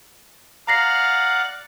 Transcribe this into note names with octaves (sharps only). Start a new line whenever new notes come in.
D5 F5 F#5 A#5 A#6 C7